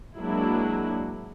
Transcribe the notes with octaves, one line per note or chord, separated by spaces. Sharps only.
F#3 G#3 A#3 D4 E4